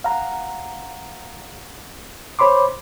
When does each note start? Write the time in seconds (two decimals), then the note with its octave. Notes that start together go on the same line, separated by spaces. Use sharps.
0.04 F5 F#5 A#5
2.39 C5 C#5 B5 C6 D6